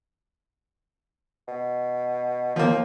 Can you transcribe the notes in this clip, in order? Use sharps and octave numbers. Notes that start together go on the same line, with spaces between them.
B2
D#2 F3 A#3